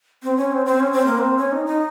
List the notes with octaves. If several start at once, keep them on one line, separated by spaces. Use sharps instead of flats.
C4
C#4
C4
C4
C#4
C4
A#3
C4
C#4
D#4
D#4